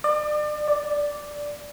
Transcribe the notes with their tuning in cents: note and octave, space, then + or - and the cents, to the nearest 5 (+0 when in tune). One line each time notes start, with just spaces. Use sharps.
D5 +35
D5 -10